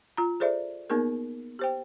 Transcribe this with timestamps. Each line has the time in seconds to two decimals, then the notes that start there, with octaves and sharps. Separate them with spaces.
0.17 F4 A#5
0.40 G#4 A4 C5 D5 E5
0.90 A#3 B3 D#4 G#4 A#4
1.59 G4 C5 G5